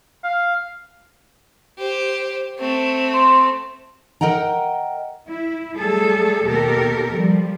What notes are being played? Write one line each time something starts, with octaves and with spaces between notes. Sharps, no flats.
F5
G4 C5
A3 C4
C6
A#4 D#5 F#5 G5 A#5
E4
F#3 G3 A3 G#4 A4
D#2 B2 G4 A4 A#4
F3 G3